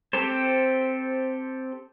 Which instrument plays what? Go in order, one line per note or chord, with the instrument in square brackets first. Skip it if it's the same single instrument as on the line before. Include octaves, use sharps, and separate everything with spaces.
[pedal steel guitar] C4 G4 A4 C5